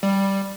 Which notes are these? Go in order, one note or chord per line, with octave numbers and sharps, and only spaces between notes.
G3